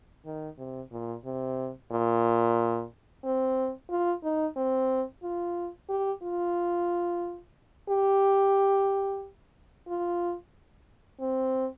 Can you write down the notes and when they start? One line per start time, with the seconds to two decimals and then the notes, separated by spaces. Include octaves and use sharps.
0.26 D#3
0.58 C3
0.92 A#2
1.25 C3
1.92 A#2
3.24 C4
3.90 F4
4.23 D#4
4.57 C4
5.23 F4
5.89 G4
6.23 F4
7.89 G4
9.88 F4
11.20 C4